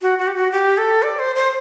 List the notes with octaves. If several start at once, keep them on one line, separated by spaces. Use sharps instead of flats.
F#4
F#4
G4
F#4
G4
A4
D5
C5
C5